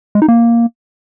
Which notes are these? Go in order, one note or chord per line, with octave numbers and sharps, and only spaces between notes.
G#3
D#4
A#3